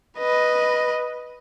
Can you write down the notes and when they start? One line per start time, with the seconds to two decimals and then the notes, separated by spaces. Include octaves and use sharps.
0.18 B4 D#5